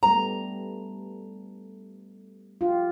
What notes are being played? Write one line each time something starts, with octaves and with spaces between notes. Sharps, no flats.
G3 A3 B3 A#5
F4 G4